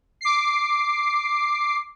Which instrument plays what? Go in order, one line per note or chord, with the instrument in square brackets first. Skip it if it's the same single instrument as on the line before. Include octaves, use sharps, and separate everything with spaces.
[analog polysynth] D6 C7